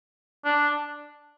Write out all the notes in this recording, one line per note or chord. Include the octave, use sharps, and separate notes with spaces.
D4